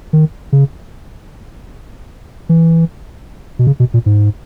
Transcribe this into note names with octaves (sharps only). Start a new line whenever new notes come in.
D#3
C#3
E3
B2
C#3
B2
A#2
G#2